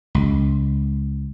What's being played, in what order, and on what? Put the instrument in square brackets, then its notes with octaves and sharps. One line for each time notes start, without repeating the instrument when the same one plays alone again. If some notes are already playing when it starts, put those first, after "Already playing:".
[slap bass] C#2